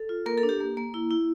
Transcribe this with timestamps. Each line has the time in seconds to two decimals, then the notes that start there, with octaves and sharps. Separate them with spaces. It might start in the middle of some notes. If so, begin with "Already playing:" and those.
Already playing: A4
0.09 F4
0.26 A#3 A#4
0.38 A4
0.43 D4
0.49 G4
0.60 A#3
0.77 A#3
0.94 E4
1.11 E4